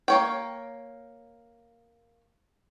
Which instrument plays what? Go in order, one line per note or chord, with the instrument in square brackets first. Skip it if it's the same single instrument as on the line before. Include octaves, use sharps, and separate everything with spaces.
[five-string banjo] A#3 C#5 G5